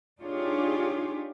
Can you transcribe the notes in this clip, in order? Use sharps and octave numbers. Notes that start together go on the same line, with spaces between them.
D4 D#4 F4 G4 G#4 C#5